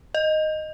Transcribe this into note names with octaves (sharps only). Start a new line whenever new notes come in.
D#5